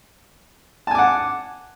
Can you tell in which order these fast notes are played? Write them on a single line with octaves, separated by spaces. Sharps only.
A5 G#5 D6 F#5